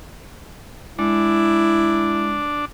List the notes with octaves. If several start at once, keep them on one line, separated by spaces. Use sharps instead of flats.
G#3 D4 E4